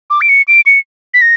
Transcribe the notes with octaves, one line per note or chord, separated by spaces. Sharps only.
D6
D7
C#7
D7
C#7
B6
A#6